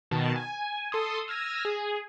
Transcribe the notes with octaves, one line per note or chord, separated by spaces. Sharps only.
B2 D#3 A5
G#5
A4 C6 D#6
E6 F6 G#6 A#6 D#7
G#4